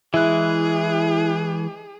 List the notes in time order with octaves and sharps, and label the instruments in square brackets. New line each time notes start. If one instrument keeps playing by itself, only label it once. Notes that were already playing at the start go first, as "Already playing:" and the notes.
[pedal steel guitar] E3 G#3 [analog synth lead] E4 [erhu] G#4 [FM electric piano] E5 F#6